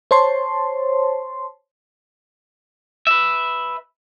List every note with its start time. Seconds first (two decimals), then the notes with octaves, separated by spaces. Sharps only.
0.11 C5 C#5 A5 C6
3.07 B4 E5